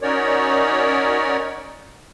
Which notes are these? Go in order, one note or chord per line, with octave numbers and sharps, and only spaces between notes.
C#4 D#4 F#4 A#4 C#5 D5